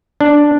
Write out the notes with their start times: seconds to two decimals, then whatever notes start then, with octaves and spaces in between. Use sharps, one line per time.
0.21 D4